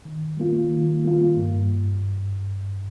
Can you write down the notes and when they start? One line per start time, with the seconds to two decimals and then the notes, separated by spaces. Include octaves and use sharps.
0.05 D#3
0.37 G3 A#3 F4
0.70 D#3
1.04 G3 A#3 F4
1.36 G2